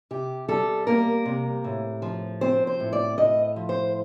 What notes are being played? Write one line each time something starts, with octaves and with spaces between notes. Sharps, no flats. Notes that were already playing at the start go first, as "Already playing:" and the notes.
C3 G4
G3 A4
A#3 A#4
C3
A2
F3
C4 C5
C5
A2
D5
A2 D#5
F3
C5